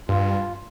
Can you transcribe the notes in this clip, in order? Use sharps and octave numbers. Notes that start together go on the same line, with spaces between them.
G2 F4